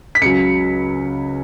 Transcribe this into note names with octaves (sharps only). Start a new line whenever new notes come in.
B6
C#2 C#3 F#3 C#7